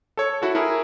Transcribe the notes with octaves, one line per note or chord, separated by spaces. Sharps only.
A4 C#5
E4 F#4 A4
E4 G#4 A#4